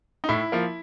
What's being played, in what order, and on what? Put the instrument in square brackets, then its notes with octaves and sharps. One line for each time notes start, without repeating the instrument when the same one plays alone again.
[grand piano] D#4
A2 E4
F3 A#3